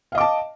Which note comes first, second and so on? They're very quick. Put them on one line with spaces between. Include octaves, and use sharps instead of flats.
F5 D#5 D6 A5